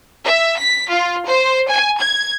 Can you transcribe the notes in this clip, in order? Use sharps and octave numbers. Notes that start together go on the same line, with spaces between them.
E5
B6
F4
C5
G#5
G#6